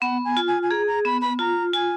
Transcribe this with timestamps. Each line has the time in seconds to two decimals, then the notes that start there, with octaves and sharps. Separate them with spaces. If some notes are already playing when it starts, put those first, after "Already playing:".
0.02 B3 F#5
0.25 G#5
0.37 F4
0.48 G#5
0.63 G#5
0.71 G#4 A#5
0.87 A#5
1.05 B3 B5
1.21 B5
1.39 F4 A#5
1.74 F4 G#5